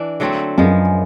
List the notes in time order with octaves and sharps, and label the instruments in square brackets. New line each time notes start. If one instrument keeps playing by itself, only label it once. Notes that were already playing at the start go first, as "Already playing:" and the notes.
Already playing: [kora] E3 D4
D3 F#3 A3 C4
[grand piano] F#2 [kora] F3 G#3 B3